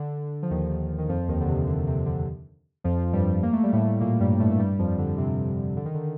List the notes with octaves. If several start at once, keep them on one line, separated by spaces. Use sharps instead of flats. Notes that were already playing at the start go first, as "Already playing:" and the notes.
Already playing: D3
F3
D#2 D#3
D#3
F2 F3
D#2 D#3
D3
C3
D3
C3
D3
F2 F3
G2 G3
A#3
A3
G3
A2 A3
A#2 A#3
G2 G3
A2 A3
A3
G2 G3
F2 F3
D3
C3
D3
D#3
D3